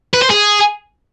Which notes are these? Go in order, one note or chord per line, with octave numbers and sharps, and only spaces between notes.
B4
C5
G#4